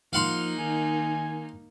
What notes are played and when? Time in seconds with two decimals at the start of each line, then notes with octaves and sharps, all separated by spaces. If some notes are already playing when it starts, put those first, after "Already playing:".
0.13 F3 A#3 D#4 F5 F#5 C6
0.58 D#3 G#5